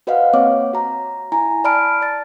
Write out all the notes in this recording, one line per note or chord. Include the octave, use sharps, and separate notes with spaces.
F#4 B4 C5 D#5 F5 F#5
A#3 C4 C#5 D6
F#4 A#5
E4 G#5 A#5
D5 A5 B5 F6 D7
D5 A6